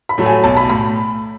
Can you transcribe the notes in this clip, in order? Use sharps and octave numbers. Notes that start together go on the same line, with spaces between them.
B5
A2 F#3 A3
G#5
B1 A5
B5
A2 B5